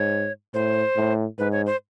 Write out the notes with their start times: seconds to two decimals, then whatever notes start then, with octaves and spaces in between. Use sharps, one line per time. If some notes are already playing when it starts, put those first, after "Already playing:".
Already playing: G#2 C#5
0.54 A2 C5
0.96 A2
1.38 G#2 B4
1.52 C#5
1.66 C5